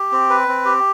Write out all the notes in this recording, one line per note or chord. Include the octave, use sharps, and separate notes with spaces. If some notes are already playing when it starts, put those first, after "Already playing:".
Already playing: G4
C4
B4
C4
G4